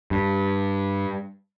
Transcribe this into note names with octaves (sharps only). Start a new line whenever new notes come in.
G2